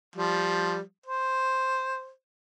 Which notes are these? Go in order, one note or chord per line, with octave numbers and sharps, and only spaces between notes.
F3 G3
C5